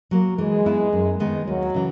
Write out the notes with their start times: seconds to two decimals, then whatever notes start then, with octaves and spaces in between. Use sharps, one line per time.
0.11 F#3 A#3
0.38 E3 G#3
0.66 B3 E4
0.93 F#2
1.20 D#3 G#3 B3 D#4
1.47 D#2 F#3
1.74 C#3 E3